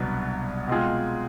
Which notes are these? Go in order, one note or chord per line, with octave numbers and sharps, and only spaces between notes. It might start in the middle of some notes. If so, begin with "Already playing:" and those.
Already playing: C2 B2 F#3 B3 D4
B2 G#3 C4 F4 G#4